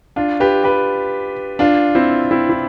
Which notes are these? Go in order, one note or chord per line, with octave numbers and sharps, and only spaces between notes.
D4 F4
G4 B4
G4 B4
D4 F4
C4 E4
C4 E4
E4